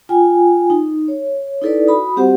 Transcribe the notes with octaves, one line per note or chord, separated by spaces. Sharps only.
F4 G5 G#5
D#4
C#5
D#4 E4 A4 B4 D5
F#4 B5 D#6
G3 C4 F#4 G4 C5 F#5